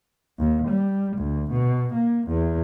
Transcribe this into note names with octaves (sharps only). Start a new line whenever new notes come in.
D#2
G3
D2
B2
A#3
E2